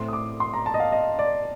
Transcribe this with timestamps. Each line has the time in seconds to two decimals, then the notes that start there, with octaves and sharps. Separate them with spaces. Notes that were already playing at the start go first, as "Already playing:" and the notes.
Already playing: A2 A3 C4 C6
0.08 D#6
0.13 D6
0.40 C6
0.54 A#5
0.66 A5
0.74 D#5
0.80 F5
0.92 D#5
1.19 D5